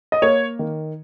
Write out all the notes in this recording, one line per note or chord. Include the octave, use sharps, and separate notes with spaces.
D#5
A#3 C#5
D#3